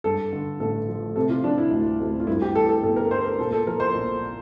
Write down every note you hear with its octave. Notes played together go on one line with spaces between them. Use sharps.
G2 A4
D3
A1 A4
F3
C3 A4
F4
F3 D4
E4
D2
D2
F4
G2 E4
G4
E3 A4
A4
G1 A4
A#4
G1 C5
A#4
A#2 A4
A4
F3 A#4
C5
A#1